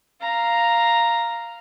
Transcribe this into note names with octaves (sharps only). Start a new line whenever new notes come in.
F5 A#5